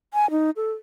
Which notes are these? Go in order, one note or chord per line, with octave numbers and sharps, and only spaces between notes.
G#5
D#4
A4